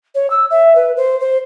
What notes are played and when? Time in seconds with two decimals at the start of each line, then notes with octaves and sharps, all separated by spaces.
0.15 C#5
0.30 E6
0.50 E5
0.76 B4
0.97 C5
1.20 C5